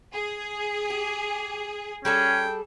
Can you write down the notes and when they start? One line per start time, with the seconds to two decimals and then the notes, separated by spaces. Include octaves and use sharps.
0.13 G#4
0.90 G4
2.05 G3 C#4 G#4 A4 G5